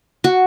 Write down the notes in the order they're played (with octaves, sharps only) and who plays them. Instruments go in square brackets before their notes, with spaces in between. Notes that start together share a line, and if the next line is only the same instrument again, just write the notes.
[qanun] F#4